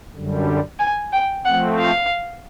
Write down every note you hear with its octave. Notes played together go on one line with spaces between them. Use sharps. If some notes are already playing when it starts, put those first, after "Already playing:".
F#2 D3 G3
G#5
G5
F3 A3 C4 F#5
F5